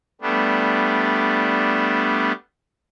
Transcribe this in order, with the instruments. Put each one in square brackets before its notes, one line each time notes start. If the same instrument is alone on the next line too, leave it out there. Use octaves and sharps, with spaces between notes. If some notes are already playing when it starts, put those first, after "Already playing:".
[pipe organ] G3 A3 B3 D4